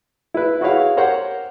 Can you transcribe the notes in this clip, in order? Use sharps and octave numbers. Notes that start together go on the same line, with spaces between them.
E4 B4
E4 F#4 G#4 B4 C#5 F5
G4 A#4 C5 C#5 F#5